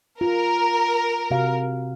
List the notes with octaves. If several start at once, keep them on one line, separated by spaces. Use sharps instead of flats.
F4 A#4
C3 F#4 F5